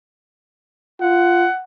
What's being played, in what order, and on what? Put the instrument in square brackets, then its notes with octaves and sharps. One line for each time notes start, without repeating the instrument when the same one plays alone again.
[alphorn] F4 [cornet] F#5